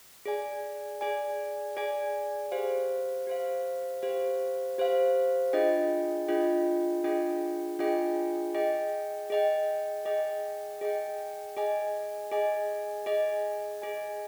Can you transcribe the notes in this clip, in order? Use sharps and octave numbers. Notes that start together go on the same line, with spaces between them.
G#4 D5 G#5
G#4 D5 G#5
G#4 D5 G#5
G4 C5 F5
G4 C5 F5
G4 C5 F5
G4 C5 F5
D4 F4 G#4 D#5 G5
D4 F4 G#4 D#5 G5
D4 F4 G#4 D#5 G5
D4 F4 G#4 D#5 G5
G#4 D#5 G5
G#4 D#5 G5
G#4 D#5 G5
G#4 D#5 G5
G#4 D#5 G#5
G#4 D#5 G#5
G#4 D#5 G#5
G#4 D#5 G#5